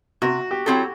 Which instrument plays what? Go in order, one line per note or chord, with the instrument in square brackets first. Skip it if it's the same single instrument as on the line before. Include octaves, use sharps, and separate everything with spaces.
[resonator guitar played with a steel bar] C3 [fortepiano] F#4
[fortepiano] G4
[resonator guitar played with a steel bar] F#3 C4 E4 A4